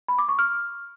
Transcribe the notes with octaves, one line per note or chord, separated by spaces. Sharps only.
B5
D6
C#6
F6